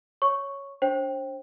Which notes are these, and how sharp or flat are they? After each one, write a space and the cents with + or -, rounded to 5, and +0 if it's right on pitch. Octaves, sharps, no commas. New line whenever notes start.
C#5 +0 C#6 +0
D4 -25 C5 +35 G5 +0